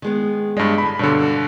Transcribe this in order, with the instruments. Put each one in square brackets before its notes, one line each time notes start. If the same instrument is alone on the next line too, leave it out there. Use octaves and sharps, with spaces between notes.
[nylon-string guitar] D#3 G#3 B3
[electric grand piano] G2 G#3 [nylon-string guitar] C#5 D#5
[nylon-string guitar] D3 G3 D4 [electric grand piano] B5
[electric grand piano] G2 D3 [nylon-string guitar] B2 C#5